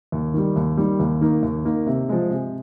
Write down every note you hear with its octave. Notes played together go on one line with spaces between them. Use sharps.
D#2
D#3 G3
D#2
D#3 G3
D#2
D#3 A#3 D#4
D#2
D#3 A#3 D#4
C3
F3 G#3
C3